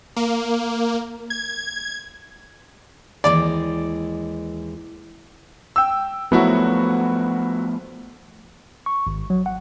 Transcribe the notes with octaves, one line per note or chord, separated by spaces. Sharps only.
A#3
G#6
D#2 E3 G#3 D5
G5 E6
F3 F#3 A3 B3 E4 F#4
C#6
G#1
F#3
F#5